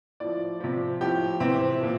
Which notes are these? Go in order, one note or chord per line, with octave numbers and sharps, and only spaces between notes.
A2 F3 D5
C3 F3
A2 F3 G4
C3 E3 C4
A#2 F3